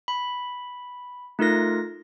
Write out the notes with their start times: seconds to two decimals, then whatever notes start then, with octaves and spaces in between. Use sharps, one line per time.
0.08 B5
1.39 A3 D#4 F4 A#4 A#6